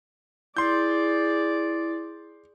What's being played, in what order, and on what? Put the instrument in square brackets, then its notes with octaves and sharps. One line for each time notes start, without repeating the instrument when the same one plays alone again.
[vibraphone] E4 [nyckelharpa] G#4 D5 [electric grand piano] C6 G6